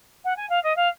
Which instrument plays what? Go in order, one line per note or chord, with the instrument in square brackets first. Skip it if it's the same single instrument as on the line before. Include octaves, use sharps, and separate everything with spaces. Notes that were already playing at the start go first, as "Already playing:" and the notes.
[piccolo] F#5
G#5
F5
D#5
F5